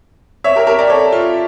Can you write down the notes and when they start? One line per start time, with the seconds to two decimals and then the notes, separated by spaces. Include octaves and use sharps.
0.44 C#5 E5
0.56 G4 A#4
0.67 G4 A#4
0.78 A#4 D5
0.89 A4 C#5
1.12 F4